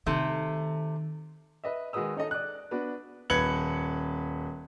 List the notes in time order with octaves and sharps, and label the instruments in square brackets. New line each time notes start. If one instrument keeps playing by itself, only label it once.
[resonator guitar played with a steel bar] C3 A3 [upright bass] D#3
[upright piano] B4 D#5 E5
D#3 G#3 F#4 B4 D#6 E6
C#4 D#4 A4 D#5
D5 F#6
B3 D4 F#4 B4
[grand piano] D#1 B4 G#6 C#7 F#7